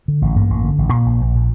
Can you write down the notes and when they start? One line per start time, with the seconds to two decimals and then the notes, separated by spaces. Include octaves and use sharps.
0.08 D3
0.22 A1
0.36 G2 A#3
0.50 A1
0.64 D3
0.78 A1
0.93 A#2
1.06 A#1
1.21 A#1
1.35 A#2